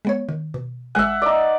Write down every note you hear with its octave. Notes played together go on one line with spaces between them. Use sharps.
G#3 B3 C#5
D#3
B2
G#1 G#3 E5 F#5 G#5
D#4 D5